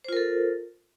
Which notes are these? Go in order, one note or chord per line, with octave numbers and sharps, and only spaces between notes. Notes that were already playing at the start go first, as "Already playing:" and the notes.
F4 A4 A#4 C5